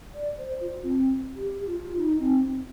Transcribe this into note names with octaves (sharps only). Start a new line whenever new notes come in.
D5
C5
F4
C4
G4
F4
D#4
C4